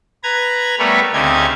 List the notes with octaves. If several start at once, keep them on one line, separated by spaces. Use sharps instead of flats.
B4 A#5 G#6
G3 A3 B3 A#4 B4 C#5
D2 C#3 C4 D#4 G4 G#6